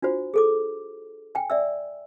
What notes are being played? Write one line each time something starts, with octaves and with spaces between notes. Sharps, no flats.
D4 F4 F#4 C5
G#4 A4 D6
G5 G#5
D5 E5 E6